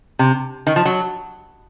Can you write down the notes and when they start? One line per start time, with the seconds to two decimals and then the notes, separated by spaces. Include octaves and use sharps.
0.19 C3
0.67 D#3
0.76 F3
0.85 F#3